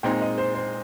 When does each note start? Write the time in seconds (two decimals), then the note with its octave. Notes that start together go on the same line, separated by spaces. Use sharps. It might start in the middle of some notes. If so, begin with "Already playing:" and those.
0.03 A#2 G#3 C4 D#4 G5
0.21 D#5
0.38 C5
0.55 C5